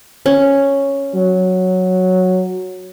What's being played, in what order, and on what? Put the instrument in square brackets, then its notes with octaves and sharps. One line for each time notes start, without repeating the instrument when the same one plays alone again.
[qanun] C#4
[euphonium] F#3